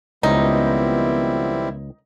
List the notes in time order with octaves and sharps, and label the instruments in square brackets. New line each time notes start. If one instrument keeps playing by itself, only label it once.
[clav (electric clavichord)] C#2 [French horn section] D#3 F3 B3 [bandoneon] G3 C4 E4 [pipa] D#4